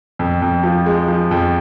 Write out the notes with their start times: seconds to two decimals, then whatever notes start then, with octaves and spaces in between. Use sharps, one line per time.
0.19 F2
0.42 F2
0.63 F3
0.86 G#3
1.08 F3
1.31 F2